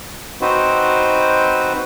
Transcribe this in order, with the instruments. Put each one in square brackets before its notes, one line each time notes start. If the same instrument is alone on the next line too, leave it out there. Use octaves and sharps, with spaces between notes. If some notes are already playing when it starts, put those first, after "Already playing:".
[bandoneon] C4 D#4 F#4 B4 C5